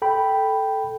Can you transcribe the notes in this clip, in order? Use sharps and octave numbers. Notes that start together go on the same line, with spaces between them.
A4 G5 B5